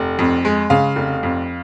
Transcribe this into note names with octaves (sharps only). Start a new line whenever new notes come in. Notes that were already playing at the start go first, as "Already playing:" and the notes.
Already playing: F1
F2
G#3
C#3 F5
F1
F2